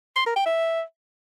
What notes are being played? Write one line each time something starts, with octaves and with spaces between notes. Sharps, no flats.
C6
A#4
G5
E5